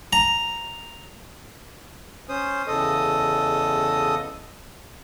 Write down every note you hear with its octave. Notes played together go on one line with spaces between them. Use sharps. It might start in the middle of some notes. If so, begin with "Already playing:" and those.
A#5
C#4 C5 D#6
E2 C#3 A4 D#5 D#6